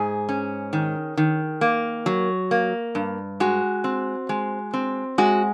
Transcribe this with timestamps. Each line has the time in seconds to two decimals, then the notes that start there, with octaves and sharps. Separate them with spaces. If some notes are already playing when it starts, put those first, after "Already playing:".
Already playing: G#2 G#4
0.29 C#4
0.73 D#3
1.17 D#3
1.61 A#3
2.06 F#3
2.51 A#3
2.95 G2
3.40 G#3 F#4
3.84 C4
4.29 G#3
4.73 C4
5.18 G#3 F#4